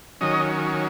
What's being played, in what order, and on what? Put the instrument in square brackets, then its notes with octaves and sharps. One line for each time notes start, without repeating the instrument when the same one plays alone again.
[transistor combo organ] D#3 F#3 C#4 D#5